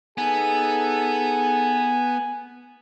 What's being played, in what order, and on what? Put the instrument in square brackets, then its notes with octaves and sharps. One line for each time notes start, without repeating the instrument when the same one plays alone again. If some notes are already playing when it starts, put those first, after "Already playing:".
[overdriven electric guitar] B3 [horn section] D#4 G#4 A4 [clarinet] G#5